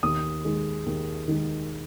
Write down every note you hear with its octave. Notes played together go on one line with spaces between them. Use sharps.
D#2 D#6
D#3 G#3
D#2
D#3 G#3